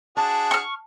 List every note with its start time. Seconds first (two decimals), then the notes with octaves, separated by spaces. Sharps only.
0.17 D4 F#4 G#4 A5
0.51 C#6 F6